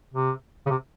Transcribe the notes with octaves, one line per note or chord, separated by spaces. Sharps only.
C3
C#3
C3